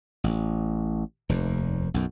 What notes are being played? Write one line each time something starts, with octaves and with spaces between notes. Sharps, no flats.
A1
F1 D#2
B1 F#2